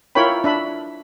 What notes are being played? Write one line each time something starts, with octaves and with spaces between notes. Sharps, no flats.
E4 F4 A#4 C#5 G5 B5
D4 E5 B5